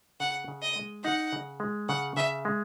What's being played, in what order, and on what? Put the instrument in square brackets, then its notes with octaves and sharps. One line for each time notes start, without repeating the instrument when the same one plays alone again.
[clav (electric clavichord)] C#3 [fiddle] F#5
[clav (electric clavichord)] C#3
[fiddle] D#5
[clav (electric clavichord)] G#3
[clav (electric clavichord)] D#4 [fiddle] F#5
[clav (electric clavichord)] C#3
G#3
[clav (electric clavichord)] C#3 [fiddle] F#5
[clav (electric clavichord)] C#3 [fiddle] E5
[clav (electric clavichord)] G#3